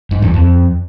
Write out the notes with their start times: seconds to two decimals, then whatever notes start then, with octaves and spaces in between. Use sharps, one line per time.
0.11 G#2
0.22 E2
0.34 F2